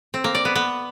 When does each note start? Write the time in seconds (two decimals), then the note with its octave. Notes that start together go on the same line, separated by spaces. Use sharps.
0.14 C4
0.24 A#3
0.35 D5
0.45 B3
0.55 B3